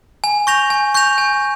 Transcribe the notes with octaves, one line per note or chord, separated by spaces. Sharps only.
G#5
C#6 G6 A#6 F7
G#5
C#6 G6 A#6 F7
G#5